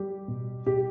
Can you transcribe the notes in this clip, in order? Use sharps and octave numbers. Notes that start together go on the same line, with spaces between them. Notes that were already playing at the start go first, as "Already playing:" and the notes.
Already playing: G3 G4
B2
B2 G4